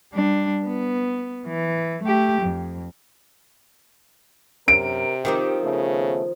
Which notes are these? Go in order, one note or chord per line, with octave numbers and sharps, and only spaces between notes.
G3 D4
B3
E3
A3 G4
F2
F#2 C3 A#4 D7
D#3 F3 C4 G4
C#3 A3 B3